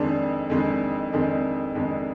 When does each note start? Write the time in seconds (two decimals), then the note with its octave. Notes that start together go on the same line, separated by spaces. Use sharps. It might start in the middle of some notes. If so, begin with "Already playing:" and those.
Already playing: F2 D#3 G#3 D4
0.50 F2 D#3 G#3 D4
1.12 F2 D#3 G#3 D4
1.75 F2 D#3 G#3 D4